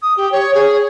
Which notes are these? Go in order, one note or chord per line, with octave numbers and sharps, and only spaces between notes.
D#6
G4
C#5
G#4